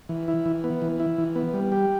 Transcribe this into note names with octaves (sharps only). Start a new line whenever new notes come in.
E3
E4
E3
B3
E3
E4
E3
B3
G3
G4